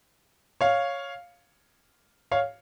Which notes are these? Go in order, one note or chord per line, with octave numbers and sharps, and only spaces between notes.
C#5 F5
C#5 F5